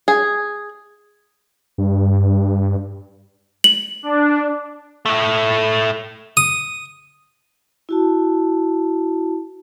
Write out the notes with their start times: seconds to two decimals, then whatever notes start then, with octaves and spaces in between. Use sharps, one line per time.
0.08 G#4
1.78 G2
3.64 F#7
4.03 D4
5.06 A2 A3
6.37 D#6
7.89 E4 F#4 A5